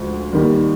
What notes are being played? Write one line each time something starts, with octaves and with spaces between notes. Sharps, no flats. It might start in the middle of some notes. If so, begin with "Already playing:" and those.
Already playing: D2 C#3 F3 G#3
D#2 D#3 G3